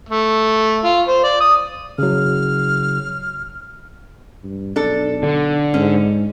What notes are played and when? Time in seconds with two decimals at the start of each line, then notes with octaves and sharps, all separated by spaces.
0.09 A3
0.84 F4
1.08 C5
1.24 D5
1.41 D#6
1.98 C#3 F#3 F6
4.44 G2
4.76 B1 D4 A4
5.23 D3
5.74 G#2 C#4